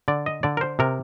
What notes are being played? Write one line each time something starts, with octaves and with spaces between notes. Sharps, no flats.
D3 D5
D#5
D3 D5
A#4
C5
C3 A#4